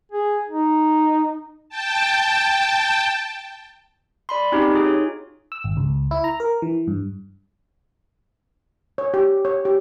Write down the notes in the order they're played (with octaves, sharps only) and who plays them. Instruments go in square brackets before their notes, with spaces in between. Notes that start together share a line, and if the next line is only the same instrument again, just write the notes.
[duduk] G#4
D#4
[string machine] G5 A5
[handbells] D5 B5 C6
C4 C#4 D#4 F#4 G4
D#4 F4 G#4
C#5
[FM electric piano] E6
G#1
C#2
E4
A#5
A#4
E3
G2
[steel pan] C#5
G4
C#5
G4